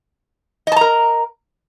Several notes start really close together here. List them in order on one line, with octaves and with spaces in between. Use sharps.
D#5 A5 A#5 A#4